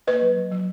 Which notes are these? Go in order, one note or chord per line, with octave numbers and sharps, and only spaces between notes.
A#3 B4 D#5
F#3
F#3
F#3